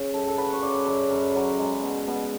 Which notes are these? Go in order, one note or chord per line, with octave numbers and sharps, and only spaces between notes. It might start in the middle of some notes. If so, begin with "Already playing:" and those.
Already playing: C#3
F#2 A4
A4
F#3 B4
C#5
C#3 D5
F#2
F#2
F#3
G#3
B2
B2